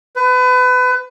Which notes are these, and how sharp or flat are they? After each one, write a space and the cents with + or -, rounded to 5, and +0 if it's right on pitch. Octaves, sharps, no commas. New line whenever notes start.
B4 +30